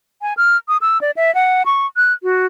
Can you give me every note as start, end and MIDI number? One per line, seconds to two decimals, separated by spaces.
0.22 0.34 80
0.37 0.57 89
0.68 0.77 87
0.81 1.00 88
1.01 1.11 74
1.16 1.33 76
1.35 1.63 78
1.66 1.86 85
1.96 2.13 90
2.23 2.46 66